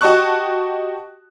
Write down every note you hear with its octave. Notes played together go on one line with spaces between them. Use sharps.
F#4 G4 D#5 A5 C#6 F#6